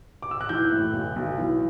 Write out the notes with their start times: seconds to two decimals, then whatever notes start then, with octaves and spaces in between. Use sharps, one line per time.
0.22 D6
0.31 E6
0.41 F#6
0.49 E3 G6
0.72 A2
0.93 B1
1.16 B1
1.38 E3